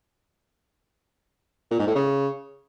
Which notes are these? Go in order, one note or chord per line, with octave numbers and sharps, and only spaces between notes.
A#2
G#2
A2
C#3